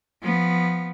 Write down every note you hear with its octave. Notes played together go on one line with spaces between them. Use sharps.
F3 B3